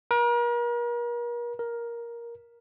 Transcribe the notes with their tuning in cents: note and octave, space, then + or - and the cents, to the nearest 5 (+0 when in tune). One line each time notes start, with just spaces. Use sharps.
A#4 +40
A#4 +10